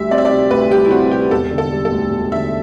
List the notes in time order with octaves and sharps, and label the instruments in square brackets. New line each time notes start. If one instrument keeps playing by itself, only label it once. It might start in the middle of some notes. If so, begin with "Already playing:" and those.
Already playing: [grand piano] D2 G3 [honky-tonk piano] E5
[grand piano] C4 [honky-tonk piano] D5
[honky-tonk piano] E5
D5
[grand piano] C3
[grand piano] D2 [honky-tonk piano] B4
[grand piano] G3 [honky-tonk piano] G4
[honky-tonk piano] E4
[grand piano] C4 [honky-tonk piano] F#4
[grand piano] C3 [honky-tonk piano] G4
[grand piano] E1 [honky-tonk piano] A4
[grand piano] D3
[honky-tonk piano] A4
[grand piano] G3
[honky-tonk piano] A4
[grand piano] D2
E1
[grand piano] D3 [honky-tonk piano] E5